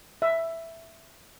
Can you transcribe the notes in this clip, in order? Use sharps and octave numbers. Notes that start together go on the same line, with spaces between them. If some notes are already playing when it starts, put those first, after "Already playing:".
E5